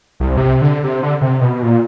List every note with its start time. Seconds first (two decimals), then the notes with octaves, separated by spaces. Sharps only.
0.20 C2
0.37 C3
0.62 D3
0.84 C3
1.03 D3
1.21 C3
1.41 B2
1.62 A#2